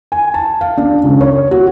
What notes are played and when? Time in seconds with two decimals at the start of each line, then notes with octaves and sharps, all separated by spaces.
0.12 G#5
0.34 A5
0.61 F5
0.77 D4
1.04 C#2
1.21 C#5
1.51 F#4